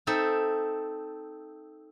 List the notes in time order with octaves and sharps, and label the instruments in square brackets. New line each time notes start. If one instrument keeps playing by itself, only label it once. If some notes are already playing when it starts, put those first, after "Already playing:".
[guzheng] C4 D#4 A4 E5